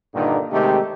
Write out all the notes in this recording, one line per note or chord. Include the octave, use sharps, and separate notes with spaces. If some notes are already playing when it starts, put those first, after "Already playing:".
G2 A#2 D3 D#3
C3 D#3 G#3 A3 D#4 G4